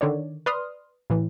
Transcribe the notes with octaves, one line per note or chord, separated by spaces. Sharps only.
D3 D#3 C#5 D5
B4 D5 C6 D#6 F6
A2 E3